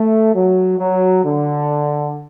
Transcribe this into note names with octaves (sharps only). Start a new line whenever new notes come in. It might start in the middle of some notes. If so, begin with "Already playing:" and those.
Already playing: A3
F#3
F#3
D3